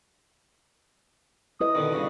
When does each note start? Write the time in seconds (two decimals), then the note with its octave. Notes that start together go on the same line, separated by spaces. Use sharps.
1.61 E4 B4 D#5 D#6
1.75 B2 D3 D#3
1.93 G2 C#3 F#4